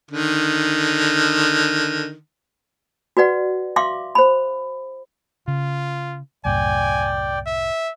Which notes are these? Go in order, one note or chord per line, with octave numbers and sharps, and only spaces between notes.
D3 D#3
F#4 B4 D5 F#5
E5 F5 C6 D6
C5 B5
C#3 F4
C2 F#2 A2 D5 G5 G#5
E5